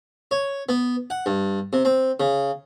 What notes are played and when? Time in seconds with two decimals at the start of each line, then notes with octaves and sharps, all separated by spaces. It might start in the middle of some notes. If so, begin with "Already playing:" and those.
0.31 C#5
0.69 B3
1.10 F#5
1.26 G2
1.73 C3
1.85 C4
2.20 C#3